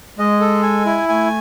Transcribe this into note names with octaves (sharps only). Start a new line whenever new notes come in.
G#3 D#5
A4
G#5
E4
A3 G#5